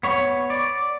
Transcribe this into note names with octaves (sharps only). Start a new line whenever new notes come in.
B3 C#5
D5